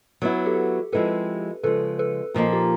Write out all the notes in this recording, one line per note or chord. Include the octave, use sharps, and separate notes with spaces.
F#3 B3 E4
G4 A4
F3 G#3 C4 E4 G4 A4 B4
C#3 F3 G#3 A4 B4
A4 B4
A#2 F3 A#3 D#4
F4 G4